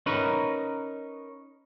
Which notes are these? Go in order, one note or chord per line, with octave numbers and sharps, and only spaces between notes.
C#4 D#4 A#4 B4